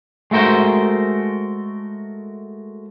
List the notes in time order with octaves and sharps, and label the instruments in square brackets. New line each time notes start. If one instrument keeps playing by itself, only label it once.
[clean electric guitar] G#3 A3 F#4 A#4 C5